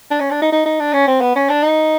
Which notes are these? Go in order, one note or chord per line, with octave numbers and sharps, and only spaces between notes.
D4
C#4
D4
D#4
D#4
D#4
D4
C#4
C4
B3
C#4
D4
D#4